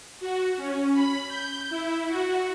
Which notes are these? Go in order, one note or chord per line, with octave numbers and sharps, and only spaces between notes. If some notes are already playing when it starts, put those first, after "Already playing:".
F#4
C#4
B5
G6
E4
F#4